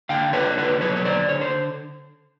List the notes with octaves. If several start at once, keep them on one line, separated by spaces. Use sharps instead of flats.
D3 F5 G5
D4 B4 C#5
D3 B4 C#5
F#3 B4 C#5
C#5
D3 C5 D5
D3 C#5
C5